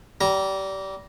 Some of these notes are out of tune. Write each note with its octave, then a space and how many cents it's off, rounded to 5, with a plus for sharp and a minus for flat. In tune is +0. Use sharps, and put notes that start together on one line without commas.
G3 -25 A#5 +0